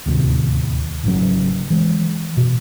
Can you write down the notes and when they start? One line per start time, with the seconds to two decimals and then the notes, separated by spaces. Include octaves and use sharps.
0.06 D1 D#2 C3
1.04 G#1 C#3 F#3
1.70 E3 G#3
2.37 B2